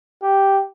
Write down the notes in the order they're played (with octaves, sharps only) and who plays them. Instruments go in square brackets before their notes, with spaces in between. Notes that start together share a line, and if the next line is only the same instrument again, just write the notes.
[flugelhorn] G4